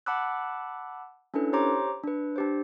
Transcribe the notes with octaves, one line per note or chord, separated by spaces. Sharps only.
F#5 A5 B5 D6 E6 F#6
C#4 D4 E4 A4 B4
G4 C5 C#5 A#5 C6 D6
D4 B4
D4 G4 C5